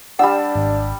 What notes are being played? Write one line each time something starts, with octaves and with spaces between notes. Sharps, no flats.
G3 D4 G4 F#5 E6
G#1